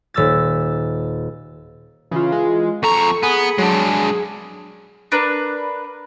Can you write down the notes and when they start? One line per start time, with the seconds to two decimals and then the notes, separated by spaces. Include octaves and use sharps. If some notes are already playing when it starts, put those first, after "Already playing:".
0.14 D#1 E6 A6
2.11 C#3 E3 F4
2.32 G#3
2.83 F2 A4 A#5 C#6
3.23 B3 G#4
3.58 F#3 G#3 D4
5.12 D4 A#4 B4